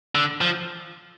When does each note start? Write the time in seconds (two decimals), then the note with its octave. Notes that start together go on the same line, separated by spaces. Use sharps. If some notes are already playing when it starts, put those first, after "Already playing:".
0.15 D3
0.41 F3